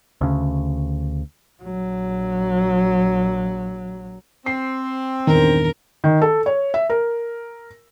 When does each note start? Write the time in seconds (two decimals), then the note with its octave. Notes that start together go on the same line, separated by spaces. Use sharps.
0.21 D2 C#3
1.63 A#1 F#3
4.46 C4 C7
5.27 A#1 E2 G2 D#3 A#4
6.04 D#3
6.22 A4
6.46 C#5
6.74 E5
6.90 A#4